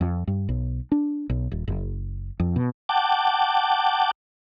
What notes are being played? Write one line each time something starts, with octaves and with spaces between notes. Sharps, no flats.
F2
G2
B1
D4
B1
D#1
F#1
F2
B2
F#5 G5 A5 D6